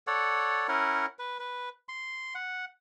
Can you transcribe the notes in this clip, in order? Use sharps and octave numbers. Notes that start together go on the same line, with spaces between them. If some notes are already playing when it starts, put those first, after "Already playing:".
A4 C#5 D5 F#5
C#4 E4 A#4 F#5
B4
B4
C6
F#5